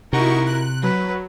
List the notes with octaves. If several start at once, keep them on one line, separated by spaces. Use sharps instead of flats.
C3 D#4 E4 F#4 A#4 C#6
F#6
F#3 B4